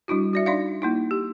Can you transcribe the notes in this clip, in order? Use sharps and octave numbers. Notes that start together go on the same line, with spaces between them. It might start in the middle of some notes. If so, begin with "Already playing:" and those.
G3 D4 E4 F#4
F#4 D5 E5
D4 D#4 D5 E5 F5
A#3 D#4 E4
G4